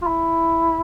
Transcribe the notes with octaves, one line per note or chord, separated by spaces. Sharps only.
F4
E4